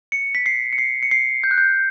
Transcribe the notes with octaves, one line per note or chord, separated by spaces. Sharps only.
C#7
B6
C7
C#7
C7
C#7
C7
G6
F#6
G6